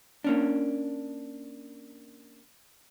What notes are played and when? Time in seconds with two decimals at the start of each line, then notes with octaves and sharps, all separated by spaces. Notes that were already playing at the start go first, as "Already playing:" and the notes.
0.24 A#3 C#4 D4